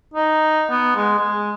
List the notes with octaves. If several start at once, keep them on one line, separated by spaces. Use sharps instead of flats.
D#4
B3
G#3
G#3